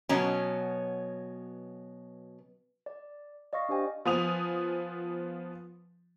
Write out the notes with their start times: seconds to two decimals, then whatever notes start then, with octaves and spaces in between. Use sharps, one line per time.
0.09 B2 F#3 B3 C#4
2.86 D5
3.53 D5 D#5 F5 C#6 A#6
3.69 D4 G4 C5 G5 G#5
4.05 F3 B3 G#5 D#6 F7